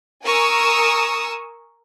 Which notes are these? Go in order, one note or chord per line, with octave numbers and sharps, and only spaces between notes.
A#4 G#5 C#6 D#6 E6